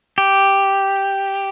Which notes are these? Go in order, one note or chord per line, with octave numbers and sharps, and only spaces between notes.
G4